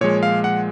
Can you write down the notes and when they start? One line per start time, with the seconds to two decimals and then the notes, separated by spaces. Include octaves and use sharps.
0.01 A#2 F3 G#3 C#5
0.23 F5
0.44 F#5